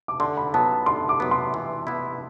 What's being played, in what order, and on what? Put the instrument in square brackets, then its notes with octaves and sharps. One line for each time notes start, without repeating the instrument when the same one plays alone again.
[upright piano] D6
[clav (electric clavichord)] D3 [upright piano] C6
[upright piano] B5
[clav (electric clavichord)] F#3 B3 [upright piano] A5
[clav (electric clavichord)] D3 [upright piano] C6
[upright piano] D6
[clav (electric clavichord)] F#3 B3
[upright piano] C6
[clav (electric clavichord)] E3
B3 E4